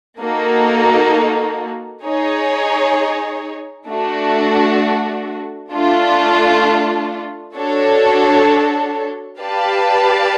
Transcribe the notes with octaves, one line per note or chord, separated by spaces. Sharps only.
A#3 D#4 F#4 A4
D#4 G#4 C#5
A3 D4 F#4
A3 D4 F4
D4 F#4 A4 C#5
G4 B4 D5 F5 A5